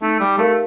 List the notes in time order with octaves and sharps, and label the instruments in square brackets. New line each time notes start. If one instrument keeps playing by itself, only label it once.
[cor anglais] A3 [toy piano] D#4
[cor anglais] G3
[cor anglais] A3 [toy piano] G4 A#4 F5 A5